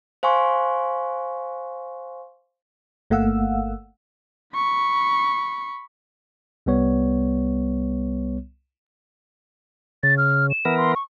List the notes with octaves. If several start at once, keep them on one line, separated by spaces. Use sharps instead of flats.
C5 F5 G#5 C6 C#6
G1 A3 A#3 F5 F#5 E6
B5 C#6
C2 G3 B3 C#5
C#3 A6
F6
E7
E3 B3 A#4
C6
C#6